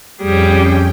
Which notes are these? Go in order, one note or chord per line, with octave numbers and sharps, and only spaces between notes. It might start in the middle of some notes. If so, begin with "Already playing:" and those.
F2 G3 C#4 G#4 G5